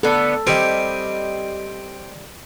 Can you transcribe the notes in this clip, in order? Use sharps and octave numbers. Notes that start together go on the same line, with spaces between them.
D3 B3 A4
G3 C4 G4 D#5 G#5